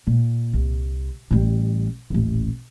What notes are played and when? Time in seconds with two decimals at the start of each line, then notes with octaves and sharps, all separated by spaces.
0.07 A#2
0.53 C2
1.31 A1 G3
2.10 D#1 A1